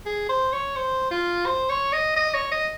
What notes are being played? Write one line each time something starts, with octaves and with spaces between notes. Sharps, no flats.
G#4
C5
C#5
C5
F4
C5
C#5
D#5
D#5
C#5
D#5